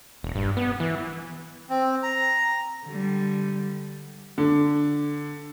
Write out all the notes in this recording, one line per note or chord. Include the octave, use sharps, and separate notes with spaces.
E1
G2
B3
E3
C4
A#5
D3 G3
D3